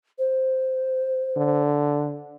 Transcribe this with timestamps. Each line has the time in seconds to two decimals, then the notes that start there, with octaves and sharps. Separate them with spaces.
0.19 C5
1.37 D3